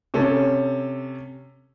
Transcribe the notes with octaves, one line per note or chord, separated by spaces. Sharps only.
C3 C#4 A4